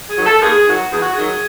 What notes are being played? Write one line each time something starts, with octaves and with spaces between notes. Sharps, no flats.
G#4
D#3 F#3
A4
D#2 G#4
D#3 F#3 F#4
E2 G#4
F#4
G#4
D#3 F#3